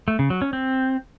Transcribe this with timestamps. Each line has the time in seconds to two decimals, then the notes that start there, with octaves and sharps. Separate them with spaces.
0.08 A3
0.19 C#3
0.30 F#3
0.42 C#4
0.53 C4